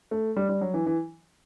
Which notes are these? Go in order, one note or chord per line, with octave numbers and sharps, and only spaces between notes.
A3
G3
G3
F#3
E3
E3